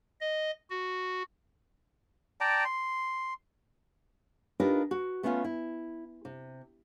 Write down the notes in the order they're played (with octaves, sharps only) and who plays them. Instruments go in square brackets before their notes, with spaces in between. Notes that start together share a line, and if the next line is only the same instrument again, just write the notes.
[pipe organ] D#5
F#4
[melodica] D5 G5 A5 A#5
C6
[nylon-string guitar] D4 D#4 F4 G4 A#4 B4
F#4
A3 B3 C#4 D4 F4
E4
C3